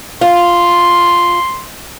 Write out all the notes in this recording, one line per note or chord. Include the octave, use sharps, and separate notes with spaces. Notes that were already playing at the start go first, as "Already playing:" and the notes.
F4 C6